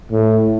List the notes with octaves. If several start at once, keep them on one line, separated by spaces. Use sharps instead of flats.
A2